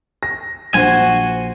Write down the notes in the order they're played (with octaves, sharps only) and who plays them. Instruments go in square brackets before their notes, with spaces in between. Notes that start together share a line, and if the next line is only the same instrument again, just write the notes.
[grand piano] A#6
[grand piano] A#1 [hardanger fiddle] F#4 C5 [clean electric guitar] G#5